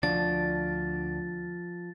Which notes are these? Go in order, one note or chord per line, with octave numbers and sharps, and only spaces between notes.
D2 F3 D4 A6